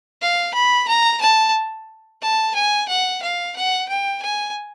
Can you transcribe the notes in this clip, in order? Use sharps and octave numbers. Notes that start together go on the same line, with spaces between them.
F5
B5
A#5
A5
A5
G#5
F#5
F5
F#5
G5
G#5